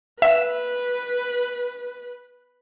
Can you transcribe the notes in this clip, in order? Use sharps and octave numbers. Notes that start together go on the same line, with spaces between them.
B4 E5